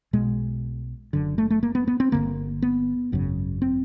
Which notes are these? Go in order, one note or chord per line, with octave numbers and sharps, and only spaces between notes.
B1 B2 G#3
F#1 F#2 D3
A3
A3
A#3
B3
B3
C4
G1 F2 D3 A#3
B3
G#1 F#2 C#3
C4